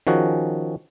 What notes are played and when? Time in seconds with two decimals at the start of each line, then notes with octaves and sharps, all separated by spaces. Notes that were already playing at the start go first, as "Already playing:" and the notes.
0.07 D#3 F3 C#4 F#4 G#4